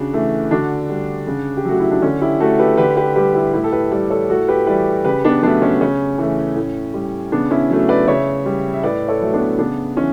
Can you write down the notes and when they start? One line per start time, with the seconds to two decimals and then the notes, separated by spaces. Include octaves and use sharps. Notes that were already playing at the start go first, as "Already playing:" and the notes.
Already playing: C#3 D4 F#4
0.13 E3 A3
0.51 D3 D4 F#4
0.90 G3
1.27 C#3
1.57 G4
1.65 F#3 A3 F#4
1.80 E4
1.91 D4
2.02 D3 C#4
2.21 E4 G4
2.40 A3 F#4 A4
2.59 G4 B4
2.78 D3 G4 B4
2.97 G4 B4
3.16 G3 G4 B4
3.34 E4 G4
3.53 A2 E4 G4
3.64 A4
3.72 G4 B4
3.92 G3 B4 D5
4.10 A4 C#5
4.29 A2 F#4 A4
4.48 G4 B4
4.67 E3 G3 B4 D5
5.05 C#3 G4 B4
5.25 B3 D4
5.43 F#3 A3 B3 D4
5.62 C#4
5.81 C#3 C#4
6.18 E3 A3
6.56 A2
6.94 G3
7.32 C#3 B3 D4
7.51 C#4 E4
7.70 F#3 A3
7.89 B4 D5
8.08 C#3 C#5 E5
8.46 G3
8.73 E5
8.83 A2 B4 D5
9.08 A4 C#5
9.21 F#3 A3
9.33 B3 D4
9.58 C#3 B3 D4
9.96 E3 C#4